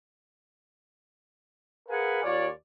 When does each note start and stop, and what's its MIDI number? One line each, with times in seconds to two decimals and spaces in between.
1.89 2.22 68
1.89 2.22 70
1.89 2.22 71
1.89 2.22 77
1.89 2.22 78
1.89 2.22 80
2.23 2.48 39
2.23 2.48 65
2.23 2.48 73
2.23 2.48 74